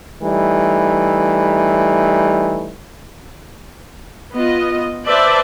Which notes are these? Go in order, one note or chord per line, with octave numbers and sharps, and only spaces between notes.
E3 G3 A3 D#4
B3 F4 D#5
B4 C5 D5 E5 A5